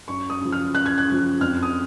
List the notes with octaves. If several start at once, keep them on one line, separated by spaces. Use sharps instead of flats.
F#2 C#6
D#6
C#3 F3
F6
F#2 F#6
G#6
F#6
C#3 F3
F2 F6
D#6